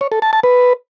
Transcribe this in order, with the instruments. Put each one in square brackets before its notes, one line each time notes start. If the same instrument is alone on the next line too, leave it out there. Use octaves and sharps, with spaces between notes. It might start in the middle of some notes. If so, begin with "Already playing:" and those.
[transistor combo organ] C#5
A4
A5
A5
B4